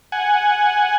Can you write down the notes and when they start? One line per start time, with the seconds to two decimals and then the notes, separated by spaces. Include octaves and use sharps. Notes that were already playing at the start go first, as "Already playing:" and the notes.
0.12 F#5 G#5